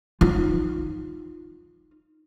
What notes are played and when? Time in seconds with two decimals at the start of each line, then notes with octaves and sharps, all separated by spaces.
0.21 D#4 F4